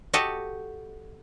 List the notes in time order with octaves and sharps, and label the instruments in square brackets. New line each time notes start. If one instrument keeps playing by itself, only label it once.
[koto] F#4 G4 A4 D#5 F#5